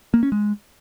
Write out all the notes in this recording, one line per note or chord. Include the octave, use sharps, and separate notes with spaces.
A#3
C#4
G#3